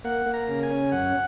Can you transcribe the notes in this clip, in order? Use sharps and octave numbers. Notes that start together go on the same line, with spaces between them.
A#3 F#5
A#3
A#5
C#3
G#5
C#4
F#2 F#5